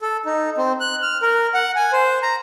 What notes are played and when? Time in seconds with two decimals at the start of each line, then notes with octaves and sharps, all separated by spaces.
0.02 A4
0.26 D#4
0.58 C4
0.80 F#6
1.02 F6
1.22 A#4
1.54 F#5
1.76 G#5
1.93 C5
2.23 A#5